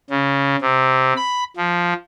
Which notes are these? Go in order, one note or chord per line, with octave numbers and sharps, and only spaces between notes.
C#3
C3
B5
F3